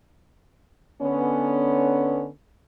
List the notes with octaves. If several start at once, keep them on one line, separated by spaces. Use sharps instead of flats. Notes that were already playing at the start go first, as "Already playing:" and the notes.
D3 B3 C#4